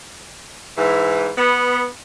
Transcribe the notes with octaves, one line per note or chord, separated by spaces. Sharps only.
G#2 E3
B3